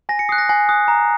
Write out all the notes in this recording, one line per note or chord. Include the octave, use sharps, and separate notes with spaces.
G#5 A#6
C#7
D#6 F#6 C7
A#6
G#5 C7
D#6 F#6
A#5